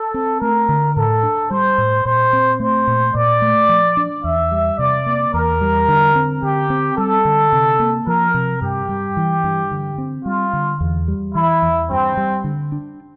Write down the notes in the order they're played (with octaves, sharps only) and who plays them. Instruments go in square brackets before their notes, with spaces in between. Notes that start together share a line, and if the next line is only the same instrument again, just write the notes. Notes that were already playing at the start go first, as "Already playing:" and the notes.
Already playing: [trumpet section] A4
[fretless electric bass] C4
[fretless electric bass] A3 [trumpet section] A#4
[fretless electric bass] D3
[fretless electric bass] A2 [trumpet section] A4
[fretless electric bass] D4
[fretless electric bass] G3 [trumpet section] C5
[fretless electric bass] A2
[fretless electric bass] A#2 [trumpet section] C5
[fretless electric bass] C4
[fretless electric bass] A3 [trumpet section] C5
[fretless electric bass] A#2
[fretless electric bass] A#2 [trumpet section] D5
[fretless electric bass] A3
F3
D4
[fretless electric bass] E2 [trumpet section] E5
[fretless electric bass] G3
[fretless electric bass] C3 [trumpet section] D5
[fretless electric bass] A#3
[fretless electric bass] E2 [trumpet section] A#4
[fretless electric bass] G3
D3
C4
[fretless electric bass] D3 [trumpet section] G4
[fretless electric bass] C4
[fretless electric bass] G3 [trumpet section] A4
[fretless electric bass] D3
C3
A#3
[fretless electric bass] F3 [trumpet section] A#4
[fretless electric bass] C3
[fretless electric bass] G2 [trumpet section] G4
[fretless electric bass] G3
E3
G2
D3
C4
[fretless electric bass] G3 [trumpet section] F4
[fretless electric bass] D3
E2
G3
[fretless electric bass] E3 [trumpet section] E4
[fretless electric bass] E2
[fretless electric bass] G2 [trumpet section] C4
[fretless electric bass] G3
D3
D4